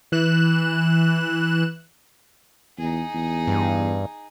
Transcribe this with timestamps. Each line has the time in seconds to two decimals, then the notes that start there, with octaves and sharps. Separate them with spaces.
0.12 E3 F#6 E7
2.78 E2 D#4 G#4
3.14 E2
3.47 G2